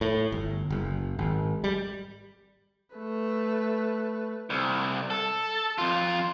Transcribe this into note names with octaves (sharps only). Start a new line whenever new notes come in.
A2
G1
F#1
G#1
G3
A3 B4
C2
A4
F2 F4